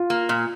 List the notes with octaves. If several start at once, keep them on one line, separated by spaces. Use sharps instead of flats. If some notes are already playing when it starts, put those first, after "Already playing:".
Already playing: F4
A#3
A#2